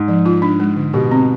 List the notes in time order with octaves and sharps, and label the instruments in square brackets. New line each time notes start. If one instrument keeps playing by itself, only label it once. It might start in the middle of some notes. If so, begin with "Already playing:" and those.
Already playing: [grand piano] G#2
[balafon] F3
F4
D4
G#3
D3
[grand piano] B2 [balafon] G4
[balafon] C4